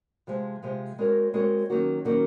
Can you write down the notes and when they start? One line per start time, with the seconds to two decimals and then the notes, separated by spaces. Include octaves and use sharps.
0.27 C3 F3 G#3
0.63 C3 F3 G#3
0.99 G#3 C4 F#4 A#4 C#5
1.34 G#3 C4 F#4 A#4 C#5
1.70 D#3 F#3 A#3 C#4 F#4
2.05 D#3 F#3 A#3 C#4 F#4